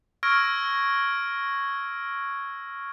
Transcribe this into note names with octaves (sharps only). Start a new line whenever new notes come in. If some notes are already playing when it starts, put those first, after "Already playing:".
C#6 E6 F6 G#6 A#6 D7